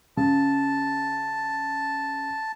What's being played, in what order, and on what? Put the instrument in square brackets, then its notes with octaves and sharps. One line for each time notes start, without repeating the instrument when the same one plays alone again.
[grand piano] C#3 [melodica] A5